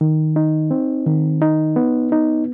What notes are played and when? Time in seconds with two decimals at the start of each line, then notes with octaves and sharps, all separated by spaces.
0.01 D#3
0.36 D#4
0.71 C4
1.07 D#3
1.42 D#4
1.76 B3
2.12 D#4